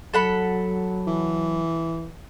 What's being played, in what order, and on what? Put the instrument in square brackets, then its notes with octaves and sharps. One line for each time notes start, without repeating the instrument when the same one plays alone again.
[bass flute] F#3 [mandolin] A4 F#5 B5
[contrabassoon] E3